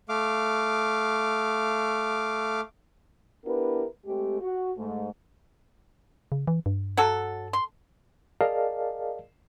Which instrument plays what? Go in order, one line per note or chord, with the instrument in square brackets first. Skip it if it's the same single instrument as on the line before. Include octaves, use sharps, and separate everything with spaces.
[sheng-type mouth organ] A3 F5 D6
[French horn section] B3 D4 E4 G4 A#4 B4
G#3 A3 C4 G4
F#4
G#2 A3
[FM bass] C#3
E3
G2
[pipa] F#3 F#4 A4
C6
[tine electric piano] G#4 A#4 D5 D#5 F5 A5